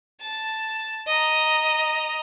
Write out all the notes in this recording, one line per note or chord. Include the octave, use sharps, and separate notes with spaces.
A5
D#5 A#5